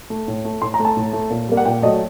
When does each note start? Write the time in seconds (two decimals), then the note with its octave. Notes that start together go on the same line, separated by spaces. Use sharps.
0.10 A3
0.28 A2
0.45 A3
0.62 A2 C6
0.74 A#5
0.80 A3
0.85 A5
0.97 A2
1.13 A3
1.30 A#2
1.48 G3 A#3
1.57 F#5
1.65 A#2 G5
1.82 F#3 A3 D#5